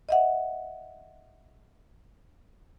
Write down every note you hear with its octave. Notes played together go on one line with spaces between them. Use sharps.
D#5 E5 F#5